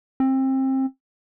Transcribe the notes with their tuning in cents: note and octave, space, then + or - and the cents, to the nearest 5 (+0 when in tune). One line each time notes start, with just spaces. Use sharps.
C4 +25